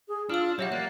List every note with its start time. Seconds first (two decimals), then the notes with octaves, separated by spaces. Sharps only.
0.08 G#4
0.30 D4 F4 E6 F6
0.59 F#3 G4 C#5 E5 F#5
0.72 A#3 D5 F#6